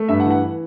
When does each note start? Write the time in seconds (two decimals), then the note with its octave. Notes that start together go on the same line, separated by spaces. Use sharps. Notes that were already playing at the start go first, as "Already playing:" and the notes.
Already playing: A3
0.09 G2 E5
0.20 F#5
0.25 E3
0.31 F#5